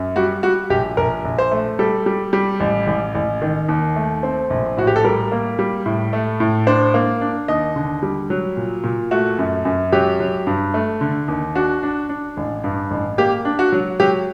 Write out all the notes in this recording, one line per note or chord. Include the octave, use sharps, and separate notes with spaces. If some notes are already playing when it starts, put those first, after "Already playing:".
Already playing: F#2
G3 F#4
G3 F#4
A#1 G4
A#1 A#4
A#1
C5
A3
G3 A4
G3
G3
A1
A1
A1
D#3
D#2
A3
C4
A#1
A2 F#4
G4
A4
G3 A#4
A#3
G3
A2
A3
A2
D4 C5
A#3
D4
D#2 D#5
D3
G3
F#3
A#2
A#2
A3 F#4
F#2
F#2
F#3 G4
F#3
G2
A3
D3
D#2
D4 F#4
D4
D4
A1
G2
A1
A#3 G4
D4
F#4
F#3
F#3 G4